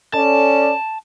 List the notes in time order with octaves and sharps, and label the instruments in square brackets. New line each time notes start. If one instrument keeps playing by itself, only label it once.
[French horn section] C#4 A4 D5 [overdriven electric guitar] A5